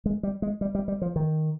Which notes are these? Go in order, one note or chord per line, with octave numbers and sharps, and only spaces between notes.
G#3
G3
G#3
G3
G3
G3
F3
D#3